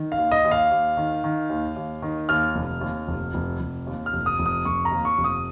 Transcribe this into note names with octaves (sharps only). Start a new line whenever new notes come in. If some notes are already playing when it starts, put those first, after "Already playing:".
Already playing: D#3
F5
D#2
D#5
D#2
F5
D#2
D#3
D#3
D#2
D#2
D#3
D#2 F6
F1
D#2
F1
F1
F1
D#2
F6
F1
D#6
F1
D#6
F1 C#6
A#5
D#2
C#6
F1
D#6